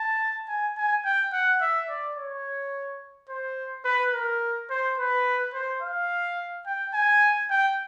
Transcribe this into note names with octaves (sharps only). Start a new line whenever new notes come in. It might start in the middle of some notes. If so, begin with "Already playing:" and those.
Already playing: A5
G#5
G#5
G5
F#5
E5
D5
C#5
C5
B4
A#4
C5
B4
C5
F5
G5
G#5
G5